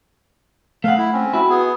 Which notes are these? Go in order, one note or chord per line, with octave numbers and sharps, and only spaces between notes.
A3 F5 F#5
E4
C4 C#4
E4 F#4
B3 G#4